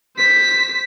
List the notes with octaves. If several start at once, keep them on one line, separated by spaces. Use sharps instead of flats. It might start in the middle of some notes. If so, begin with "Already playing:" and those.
C5 B6